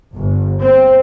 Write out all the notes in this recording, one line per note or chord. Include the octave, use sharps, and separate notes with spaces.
G1
C4